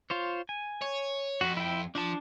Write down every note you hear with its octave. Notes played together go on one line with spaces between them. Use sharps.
F4 C5 C#5
G#5
C#5
F2 F#4
E4 G5
F3 D4 A5